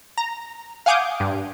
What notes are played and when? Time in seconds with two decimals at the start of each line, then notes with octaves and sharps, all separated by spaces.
0.18 A#5
0.86 F5 F#5 G#5 D6 D#6 G6
1.20 G2